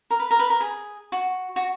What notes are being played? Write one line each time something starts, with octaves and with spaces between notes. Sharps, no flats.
A#4
B4
A#4
B4
A#4
G#4
F#4
F#4